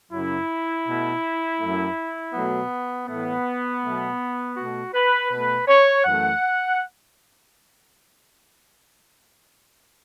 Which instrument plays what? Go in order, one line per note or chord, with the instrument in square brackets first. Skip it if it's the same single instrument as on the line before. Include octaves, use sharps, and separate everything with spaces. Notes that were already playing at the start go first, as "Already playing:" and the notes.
[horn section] F#2 C#3 F#3 E4
B2 A3
F#2 F#3 A3
B2 F#3 A3 B3
A2 E3 A3 B3
B2 F#3 A3
B2 A3 F#4
B4
B2 A3 B4
C#5
F#2 E3 A3 F#5